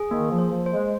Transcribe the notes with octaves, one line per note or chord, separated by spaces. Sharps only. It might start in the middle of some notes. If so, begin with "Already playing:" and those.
Already playing: G#4
D#3 A#3
F3
C5
F3
C5
G#3